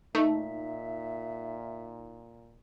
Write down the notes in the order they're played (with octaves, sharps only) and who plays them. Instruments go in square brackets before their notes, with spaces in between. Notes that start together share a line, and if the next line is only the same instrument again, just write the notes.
[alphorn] A#2 [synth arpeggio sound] A3 [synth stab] D#4 [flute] E5